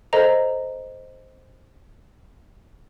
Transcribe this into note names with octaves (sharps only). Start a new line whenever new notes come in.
A4 A#4 C5 D#5 A#5